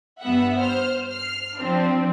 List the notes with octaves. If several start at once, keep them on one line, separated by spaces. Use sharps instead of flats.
G2 B3 E5 F#5
C5 F6
F6 C7
F3 C4 D4